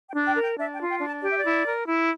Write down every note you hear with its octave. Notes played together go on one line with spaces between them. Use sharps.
G5
D4
G5
A#4
G5
D4 E5
G5
F4
G5
D4
A5
G4 D5
E5
D5
E4
A#4
E4